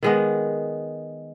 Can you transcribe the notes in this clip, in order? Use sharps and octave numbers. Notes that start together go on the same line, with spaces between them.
D#3 G#3 B3